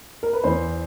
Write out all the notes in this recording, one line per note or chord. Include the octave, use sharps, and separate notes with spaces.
A#4
B4
E2 C5